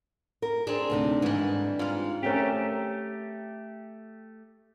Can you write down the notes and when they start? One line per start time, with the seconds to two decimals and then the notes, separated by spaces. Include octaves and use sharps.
0.42 A#4
0.67 C4 D4 G#4
0.90 D2 C3 D#4
1.22 G#2 D#3 E3 G3
1.79 G#2 F4 F5
2.23 A3 C4 C#4 G4 A#4